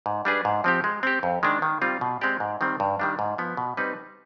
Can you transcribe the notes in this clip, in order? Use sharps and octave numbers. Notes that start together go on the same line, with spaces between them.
G#2
G3 D4 G#4 B4
G#2
F3 C4 G4
G#3
C4 G4
F2
D#3 G#3 D4
D#3
G3 C4 F4
B2
G#3 C4 G4 D5
G#2
D#3 G3 C4
G2
D#3 G3 D4
G#2
F3 B3
B2
G3 C4 D#4 B4